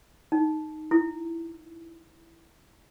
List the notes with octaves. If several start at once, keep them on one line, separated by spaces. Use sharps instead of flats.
D#4
E4